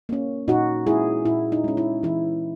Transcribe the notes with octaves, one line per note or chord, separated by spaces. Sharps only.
A#3 C#4
A#2 D#4 F#4
G#3 C#4 E4 G#4
A#2 E4
D#4
G#3 C#4
E4
E3 E4